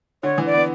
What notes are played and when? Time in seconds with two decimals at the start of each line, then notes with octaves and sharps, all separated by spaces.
0.23 D3 C#5
0.38 E3
0.46 D5
0.54 B3